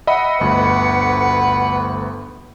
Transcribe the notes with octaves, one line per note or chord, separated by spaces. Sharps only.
D#5 E5 F#5 B5
G1 D2 B4